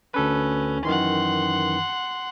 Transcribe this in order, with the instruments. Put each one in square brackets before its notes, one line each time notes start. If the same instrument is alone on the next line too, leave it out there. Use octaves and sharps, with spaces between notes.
[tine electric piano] D2 A4 B4 [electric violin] C#4
[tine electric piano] F#2 D#3 E3 [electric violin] F#5 C6